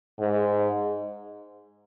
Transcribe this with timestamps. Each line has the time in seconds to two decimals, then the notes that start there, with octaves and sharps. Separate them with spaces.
0.19 G#2